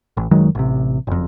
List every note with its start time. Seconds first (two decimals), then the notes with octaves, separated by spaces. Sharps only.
0.17 A1
0.31 F#1 D#3 F#3 G#3
0.55 A1 C3
1.07 F#1 F2